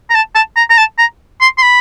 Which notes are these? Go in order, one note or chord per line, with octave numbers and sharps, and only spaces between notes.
A#5
A5
A5
A#5
A#5
A5
A#5
C6
C6
B5